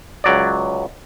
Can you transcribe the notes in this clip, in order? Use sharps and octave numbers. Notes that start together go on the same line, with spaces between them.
C#2 F#3 D5